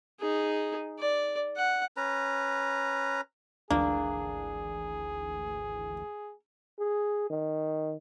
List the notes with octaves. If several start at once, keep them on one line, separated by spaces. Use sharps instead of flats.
D#4 G#4
D5
F#5
C#4 B4 A#5
G#1 D2 E3 A#3 D4 G#4
G#4
D#3